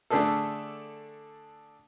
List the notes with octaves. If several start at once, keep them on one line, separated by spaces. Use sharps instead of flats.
D3 A3 D4 G#4 A4